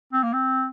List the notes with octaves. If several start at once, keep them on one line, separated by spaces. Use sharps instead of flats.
C4
A#3
C4